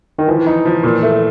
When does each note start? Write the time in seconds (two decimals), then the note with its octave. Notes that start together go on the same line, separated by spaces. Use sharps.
0.19 D#3
0.28 E3 F3
0.46 D#4
0.65 F3
0.83 A#2
1.03 A3